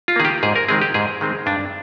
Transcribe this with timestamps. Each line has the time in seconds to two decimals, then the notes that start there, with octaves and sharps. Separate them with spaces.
0.08 F4
0.16 D#3 A#3 G#4
0.25 G4
0.43 G#2 G#4
0.56 A#4
0.68 D#3 G#3 C4 G#4
0.81 G4
0.94 G#2 G#4
1.21 D#3 G#3 C4
1.46 G2 D4